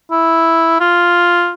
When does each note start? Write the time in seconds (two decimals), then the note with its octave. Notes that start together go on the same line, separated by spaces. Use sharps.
0.11 E4
0.80 F4